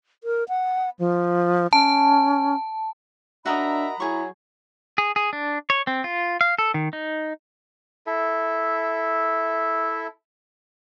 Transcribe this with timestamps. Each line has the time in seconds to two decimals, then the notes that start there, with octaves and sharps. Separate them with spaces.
0.24 A#4
0.49 F#5
0.99 F3
1.73 C#4 A5
3.46 D4 F#4 A#4 D#5 E5 A#5 B5 D#6
4.00 F#3 E4 G#4 C#6
4.98 G#4
5.16 G#4
5.33 D4
5.70 C#5
5.87 C4
6.04 F4
6.41 F5
6.59 A4
6.74 D#3
6.93 D#4
8.07 E4 A4 E5